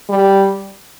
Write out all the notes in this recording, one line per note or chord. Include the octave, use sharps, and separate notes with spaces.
G3